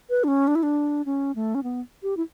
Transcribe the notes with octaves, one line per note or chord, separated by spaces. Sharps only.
B4
D4
C#4
D4
E4
D4
C#4
A3
C#4
B3
G4
E4